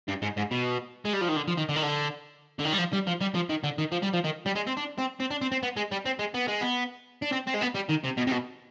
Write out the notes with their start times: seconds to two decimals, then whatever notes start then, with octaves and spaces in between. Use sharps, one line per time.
0.08 G2
0.22 G#2
0.37 G#2
0.51 B2
1.05 G#3
1.13 G3
1.21 F3
1.28 D#3
1.36 D3
1.48 F3
1.58 D#3
1.69 D3
1.76 D#3
1.83 D3
2.59 D3
2.65 D#3
2.72 G3
2.78 F3
2.93 G3
3.07 F3
3.21 G3
3.35 F3
3.50 D#3
3.64 D3
3.78 D#3
3.92 F3
4.02 G3
4.13 F3
4.24 D#3
4.46 G3
4.56 G#3
4.67 C4
4.77 D4
4.99 C4
5.20 C4
5.31 D4
5.41 C4
5.52 C4
5.63 B3
5.76 G#3
5.91 G3
6.05 C4
6.19 G#3
6.34 B3
6.48 G#3
6.61 B3
7.22 D4
7.32 C4
7.47 C4
7.54 G#3
7.62 B3
7.75 G3
7.90 D#3
8.04 C3
8.18 B2
8.27 C3
8.32 B2